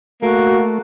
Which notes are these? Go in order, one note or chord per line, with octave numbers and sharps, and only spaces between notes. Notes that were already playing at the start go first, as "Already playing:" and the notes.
A3 A#3 F#4